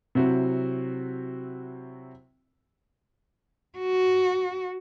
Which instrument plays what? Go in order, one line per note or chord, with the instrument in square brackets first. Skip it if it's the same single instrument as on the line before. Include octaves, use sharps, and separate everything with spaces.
[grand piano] C3 F#3 C4 E4 F#4
[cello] F#4